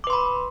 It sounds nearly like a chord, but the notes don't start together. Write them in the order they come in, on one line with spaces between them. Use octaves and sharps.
D6 B4 C6 B5